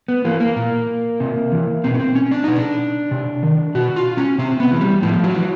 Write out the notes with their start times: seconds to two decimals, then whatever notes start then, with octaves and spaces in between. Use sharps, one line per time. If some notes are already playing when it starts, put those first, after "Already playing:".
0.08 B3
0.25 E3 A#3
0.40 A#3
0.56 A#2
1.20 C3
1.52 E3
1.84 B2 C4
1.94 C#4
2.00 C4
2.15 C#4
2.31 D4
2.44 B2 D#4
2.56 D4
3.11 C3
3.43 D#3
3.75 B2 F#4
3.96 F4
4.17 C#4
4.38 C3 C4
4.60 B3
4.71 E3
4.81 G3
5.02 A2 F3
5.24 F#3
5.34 E3